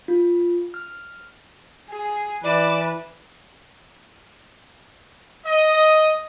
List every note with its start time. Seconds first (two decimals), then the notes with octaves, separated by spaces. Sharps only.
0.08 F4
0.74 F6
1.91 G#4
2.44 E3 B4 D5 D6 E7
5.45 D#5